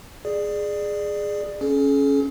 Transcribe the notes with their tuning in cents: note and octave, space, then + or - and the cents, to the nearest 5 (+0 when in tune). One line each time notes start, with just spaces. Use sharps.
G#4 +0 D5 +20
C#4 +0 G#4 +45